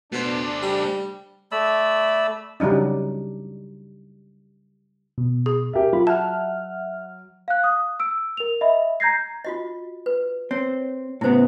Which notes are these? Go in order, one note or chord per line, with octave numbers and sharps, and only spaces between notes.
B2 A3 D4 C5
G3
A3 D5 B5 E6
C#3 F#3 G3 D4 D#4
B2
G#4
G4 A#4 E5
F#3 F4 B5
E5 F#5 A5 F6
F5 F#6
D#6
E6 D7
A#4 F7
D#5 E5 B5
A#5 G6 G#6 A#6 C7
F4 F#4 D#5
B4
C4 C#5
A2 C#3 B3 E4 C5